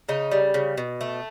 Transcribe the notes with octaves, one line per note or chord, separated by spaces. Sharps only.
C#3 D#4
G3
C#3
B2
A3